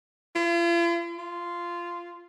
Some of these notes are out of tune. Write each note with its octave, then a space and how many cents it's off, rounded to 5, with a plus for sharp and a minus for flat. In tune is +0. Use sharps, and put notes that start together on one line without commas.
F4 -45
F4 -10